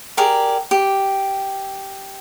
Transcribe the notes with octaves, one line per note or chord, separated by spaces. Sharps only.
G4 G#4 A#4 D5
G4